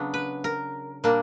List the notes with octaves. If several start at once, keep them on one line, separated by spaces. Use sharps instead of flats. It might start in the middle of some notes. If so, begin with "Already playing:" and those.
Already playing: C#3 F#3 B3 D4
B4
A#4
A#2 G3 A#3 D4